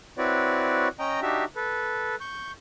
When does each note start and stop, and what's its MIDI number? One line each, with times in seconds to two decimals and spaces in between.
0.18 0.88 60
0.18 0.88 64
0.18 0.88 66
0.18 0.88 71
0.18 0.88 73
0.18 0.88 74
0.99 1.20 61
0.99 1.20 75
0.99 1.20 79
0.99 1.20 82
1.22 1.45 62
1.22 1.45 63
1.22 1.45 66
1.22 1.45 67
1.22 1.45 76
1.56 2.15 69
1.56 2.15 71
2.21 2.52 85
2.21 2.52 91